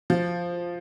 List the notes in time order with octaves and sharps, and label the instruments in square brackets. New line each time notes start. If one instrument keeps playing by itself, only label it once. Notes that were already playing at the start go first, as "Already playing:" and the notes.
[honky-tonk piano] F3